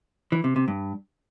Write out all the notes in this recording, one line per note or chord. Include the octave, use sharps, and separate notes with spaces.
E3
C3
C3
G2